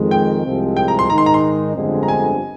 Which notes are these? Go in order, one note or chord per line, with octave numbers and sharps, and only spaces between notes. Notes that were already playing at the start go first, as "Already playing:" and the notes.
Already playing: F2 D#3 G#3
G5
C2 C3 F3 G#3 C4
G5
A#5
C6
G#2 D#3 G#3 D#4 A#5
C6
A#5
C6
G1 F2 D3 G#3 C4
A#5
G#5